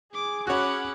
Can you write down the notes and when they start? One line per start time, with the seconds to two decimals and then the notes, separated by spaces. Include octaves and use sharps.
0.14 G#4 D6
0.47 C#4 F#4 C#5 F#5 B5 D6